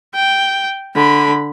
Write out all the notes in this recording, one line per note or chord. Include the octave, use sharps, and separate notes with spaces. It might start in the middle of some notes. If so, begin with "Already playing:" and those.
G5
D3 B5